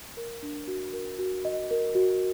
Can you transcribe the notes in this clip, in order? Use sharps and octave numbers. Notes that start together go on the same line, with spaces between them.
A#4
D4
F#4
A#4
F#4
D#5
A#4
F#4